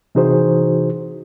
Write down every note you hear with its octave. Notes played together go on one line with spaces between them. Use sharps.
C3 E3 D#4 F#4 G#4 C5